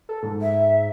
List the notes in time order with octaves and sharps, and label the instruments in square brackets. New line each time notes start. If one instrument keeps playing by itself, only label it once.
[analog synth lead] A4
G#2
[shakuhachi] E5